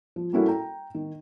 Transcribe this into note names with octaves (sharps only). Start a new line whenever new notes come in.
F3
G3 A#3 C#4 E4 F#4 A4
G5 A#5
D#3